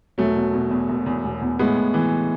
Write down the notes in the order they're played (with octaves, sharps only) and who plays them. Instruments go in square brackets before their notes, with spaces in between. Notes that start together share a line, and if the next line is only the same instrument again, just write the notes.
[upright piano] E1 F#3 A3
B2
B2
E2
E1
E2
E1
E2
A2 G#3 B3
A2
E3